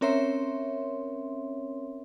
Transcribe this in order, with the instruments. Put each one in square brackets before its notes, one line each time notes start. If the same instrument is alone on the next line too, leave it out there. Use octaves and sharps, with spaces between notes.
[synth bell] C4 C#4 A#4 C#5 E5 C6